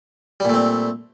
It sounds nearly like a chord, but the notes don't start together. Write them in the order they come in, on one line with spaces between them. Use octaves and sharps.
G3 A#2 A3 C4